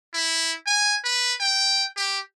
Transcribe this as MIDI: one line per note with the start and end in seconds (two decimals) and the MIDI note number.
0.14 0.54 64
0.66 0.97 80
1.04 1.34 71
1.40 1.87 79
1.97 2.19 67